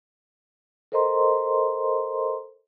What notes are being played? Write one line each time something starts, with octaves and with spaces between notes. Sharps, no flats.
A4 A#4 C5 D#5 A#5 C6